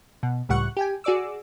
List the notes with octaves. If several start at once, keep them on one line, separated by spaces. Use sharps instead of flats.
B2
C#2 A2 G3 F#5 C#6 F#6
G4 G5 G#5
F#4 G#4 D5 D6 E6